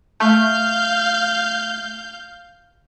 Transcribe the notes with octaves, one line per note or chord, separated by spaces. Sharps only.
A3 F5 G6